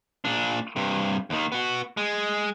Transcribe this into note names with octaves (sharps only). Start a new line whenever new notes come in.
A#2 D4
G2 C3
D#2 D#3
B3 F#4
G#3